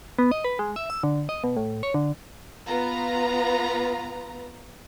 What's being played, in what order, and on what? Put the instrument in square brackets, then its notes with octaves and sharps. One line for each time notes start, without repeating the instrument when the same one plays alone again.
[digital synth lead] B3
D#5
B4
G#3
E5
E6
D3
D#5
B2
A2
C#5
D3
[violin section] B3 F4 B4 A#5